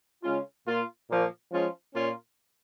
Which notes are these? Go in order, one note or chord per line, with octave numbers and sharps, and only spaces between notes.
C#3 G#3 C#4 F4
A#2 A#3 F4
A#2 F3 A#3 F4
F3 G#3 C#4 F4
A#2 A#3 C#4 F4